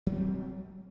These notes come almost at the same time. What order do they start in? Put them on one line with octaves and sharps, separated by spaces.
F#3 D4 C4 G3